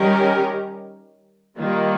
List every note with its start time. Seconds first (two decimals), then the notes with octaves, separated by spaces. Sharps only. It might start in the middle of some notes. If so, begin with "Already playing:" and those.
Already playing: D#3 G3 C#4 G4 A#4
1.57 D#3 G3 A#3 F4